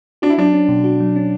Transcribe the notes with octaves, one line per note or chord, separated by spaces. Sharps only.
D4 F#4
E4
F#3 D4
C#4
B2
F#4
F#3
C#4